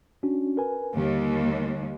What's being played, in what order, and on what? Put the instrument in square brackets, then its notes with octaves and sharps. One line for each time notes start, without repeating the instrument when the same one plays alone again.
[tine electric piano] C#4 D4 F#4
A#4 B4 G#5
[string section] D#2 [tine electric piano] D3 G3